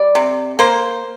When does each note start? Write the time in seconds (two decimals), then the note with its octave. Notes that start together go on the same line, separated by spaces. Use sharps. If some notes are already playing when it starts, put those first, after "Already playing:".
Already playing: G3 D5
0.15 C3
0.59 A#3 C5